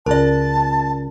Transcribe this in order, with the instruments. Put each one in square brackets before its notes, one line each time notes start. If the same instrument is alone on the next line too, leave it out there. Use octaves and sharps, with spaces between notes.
[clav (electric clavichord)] C#2 [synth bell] A#4 D5 [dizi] A5